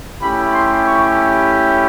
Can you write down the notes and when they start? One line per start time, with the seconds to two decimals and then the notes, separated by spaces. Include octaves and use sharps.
0.20 A3 C#4 E4 G4 B5
0.52 C6
0.85 C#6